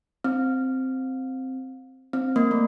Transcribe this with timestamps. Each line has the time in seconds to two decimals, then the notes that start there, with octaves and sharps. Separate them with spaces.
0.24 C4
2.13 C4
2.36 A#3
2.51 A3